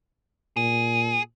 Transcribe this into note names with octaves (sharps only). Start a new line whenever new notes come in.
A#2 G#4